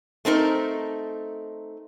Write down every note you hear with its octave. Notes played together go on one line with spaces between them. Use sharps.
A3 C4 D#4 A#4